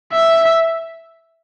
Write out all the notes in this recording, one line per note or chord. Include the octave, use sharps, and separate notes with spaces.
E5